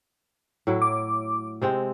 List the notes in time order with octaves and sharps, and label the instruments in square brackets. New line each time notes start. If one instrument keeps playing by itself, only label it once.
[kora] A2 F#3 E4
[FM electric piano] D6
[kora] C3 G#3 C4